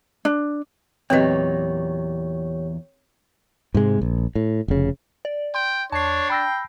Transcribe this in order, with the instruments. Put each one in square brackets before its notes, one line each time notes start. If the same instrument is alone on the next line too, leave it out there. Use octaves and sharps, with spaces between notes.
[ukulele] D4
[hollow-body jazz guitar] E2 A#2 F#3 [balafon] C4 B4 D#5 [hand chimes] G4 C#5
[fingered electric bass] G#2 C3 G#3
A#1
A2
F1 C#3
[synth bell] D5
[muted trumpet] G5 [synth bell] C6
[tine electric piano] E2 [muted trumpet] D4 [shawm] C#5 [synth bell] A5 C7
[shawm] G5 [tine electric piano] B5 E6 A#6